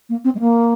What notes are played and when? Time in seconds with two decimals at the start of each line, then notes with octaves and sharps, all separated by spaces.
0.09 A#3
0.24 C4
0.35 G#3
0.40 A#3